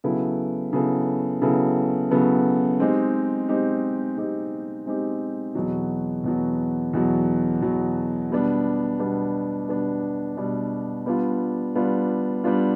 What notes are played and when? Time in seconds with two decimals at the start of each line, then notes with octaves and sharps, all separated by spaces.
0.04 C#3 F#3 B3 E4 A4
0.73 C#3 F#3 B3 E4 A4
1.42 C#3 F#3 B3 E4 A4
2.11 C#3 F#3 B3 E4 A4
2.80 G#3 C4 D#4 G4
3.49 G#3 C4 D#4 G4
4.18 G#3 C4 D#4 G4
4.86 G#3 C4 D#4 G4
5.55 E2 B2 F#3
6.24 E2 B2 F#3
6.93 E2 B2 F#3
7.62 E2 B2 F#3
8.30 B2 G3 B3 D4
8.99 B2 G3 B3 D4
9.68 B2 G3 B3 D4
10.37 B2 G3 B3 D4
11.06 G3 B3 D4 F4
11.75 G3 B3 D4 F4
12.44 G3 B3 D4 F4